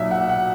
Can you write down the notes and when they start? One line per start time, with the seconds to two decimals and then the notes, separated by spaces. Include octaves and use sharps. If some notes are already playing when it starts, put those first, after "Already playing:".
Already playing: B1 A#2 E5
0.11 F#5
0.21 B2
0.29 F#5